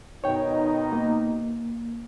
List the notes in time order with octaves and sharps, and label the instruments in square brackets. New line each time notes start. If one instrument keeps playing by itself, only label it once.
[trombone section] B2 D#3 D#4 [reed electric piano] C#5 G5
[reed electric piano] A#3